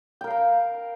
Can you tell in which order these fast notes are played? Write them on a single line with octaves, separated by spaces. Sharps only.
G5 A#4 F5 A#5